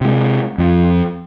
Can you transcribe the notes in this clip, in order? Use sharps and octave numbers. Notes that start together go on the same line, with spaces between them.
C3 G#3
F2